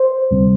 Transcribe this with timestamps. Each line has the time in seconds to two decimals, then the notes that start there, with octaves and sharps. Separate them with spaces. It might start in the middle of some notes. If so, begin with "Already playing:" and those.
Already playing: C5
0.31 D2 C3 G3 C4